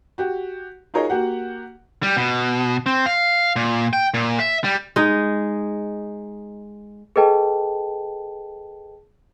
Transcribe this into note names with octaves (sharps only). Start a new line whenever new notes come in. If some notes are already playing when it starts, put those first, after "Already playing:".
F#4 G4
D#4 F4 G#4 A#4 C#5 D#5
A#3 F#4 G4 F#5
G3
B2
C4
F5
A#2
G5
A#2
E5
G3
G#3 D#4
G#4 A4 B4 D#5 G5 A5